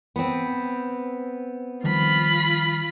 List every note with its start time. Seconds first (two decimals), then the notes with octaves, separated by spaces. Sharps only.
0.16 B3 C4
1.84 D#3 F3 G3 F4 B5